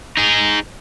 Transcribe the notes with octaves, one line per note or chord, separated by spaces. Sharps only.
D#4 G#4